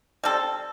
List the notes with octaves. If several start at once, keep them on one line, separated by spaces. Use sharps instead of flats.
G3 C4 A4